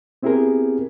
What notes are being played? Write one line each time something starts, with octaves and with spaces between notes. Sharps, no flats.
B3 C4 E4 G4 G#4 A#4